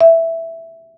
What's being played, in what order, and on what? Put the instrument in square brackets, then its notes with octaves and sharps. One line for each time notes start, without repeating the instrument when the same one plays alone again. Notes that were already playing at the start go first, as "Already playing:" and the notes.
[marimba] E5